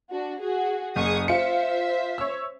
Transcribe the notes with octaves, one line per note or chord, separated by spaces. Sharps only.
D4 F#4
F#4 G#4
F#1 G#4 C#6 D#6
F4 C5 E5 C#7
C#5 E6